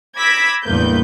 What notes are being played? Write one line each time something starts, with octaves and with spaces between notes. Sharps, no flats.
B5 D6 E6 G#6 A#6 B6
A1 E2 G2 A#3 B4 G6